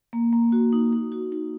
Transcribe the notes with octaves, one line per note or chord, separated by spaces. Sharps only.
A#3
A#3
F#4
D#4
D#4
F#4
D#4